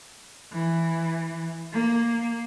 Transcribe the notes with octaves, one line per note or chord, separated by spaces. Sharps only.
E3
A#3